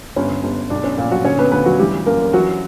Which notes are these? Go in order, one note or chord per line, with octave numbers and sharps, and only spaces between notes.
G1 C#4
G1
B1 D4
C#4
A#2
F#3 F#4
D3 C#4 C#5
B3 B4
D2 B3 B4
F#3 F#4
E3 G3 G4
F#2 A#3 A#4
E3 F#3 F#4